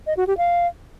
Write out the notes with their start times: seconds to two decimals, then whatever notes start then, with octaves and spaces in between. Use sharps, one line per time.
0.07 D#5
0.17 F#4
0.27 G4
0.37 F5